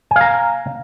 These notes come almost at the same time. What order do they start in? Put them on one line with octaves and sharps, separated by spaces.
G#5 F5 A#5